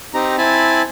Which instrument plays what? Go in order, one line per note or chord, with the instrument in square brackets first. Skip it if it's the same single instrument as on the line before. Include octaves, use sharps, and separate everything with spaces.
[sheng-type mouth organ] C4 D#4 G4 A#5
C4 E4 G#5 A5 B5